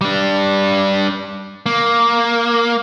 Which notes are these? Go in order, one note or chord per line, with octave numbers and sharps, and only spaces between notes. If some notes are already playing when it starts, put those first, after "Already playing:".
G3 D4
A#3